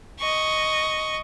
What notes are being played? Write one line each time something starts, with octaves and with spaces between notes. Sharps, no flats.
D#5 C#6